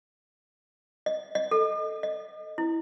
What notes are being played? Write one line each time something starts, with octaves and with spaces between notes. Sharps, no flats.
D#5
D#5
A4
D#5
E4